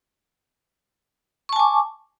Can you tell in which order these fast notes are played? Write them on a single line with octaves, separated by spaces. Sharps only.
C#6 A5 G#5 D6